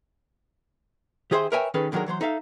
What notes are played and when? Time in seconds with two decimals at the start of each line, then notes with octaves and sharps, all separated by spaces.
1.31 D#3 G4 G#4 C5 E5 C6
1.52 A#4 B4 C#5 E5 G5 G#5
1.74 D#3 C#4 G#4 A4 B4
1.92 D3 D#3 F#3 B3 G#4 A#4
2.06 E3 F#3 C5 C6
2.21 D#4 A4 E5 F5